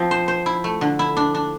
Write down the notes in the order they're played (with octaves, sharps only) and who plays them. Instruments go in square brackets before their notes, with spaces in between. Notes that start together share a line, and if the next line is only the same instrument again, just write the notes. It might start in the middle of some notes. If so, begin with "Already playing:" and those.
Already playing: [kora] F3 [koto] C4
[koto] C5
C5
E4
A3
D3
E4
D4
D4